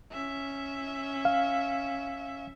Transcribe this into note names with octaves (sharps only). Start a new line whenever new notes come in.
C#4 E5
F5